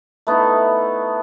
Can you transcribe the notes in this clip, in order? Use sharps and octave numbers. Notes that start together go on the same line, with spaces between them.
A3 B3 D#4 E4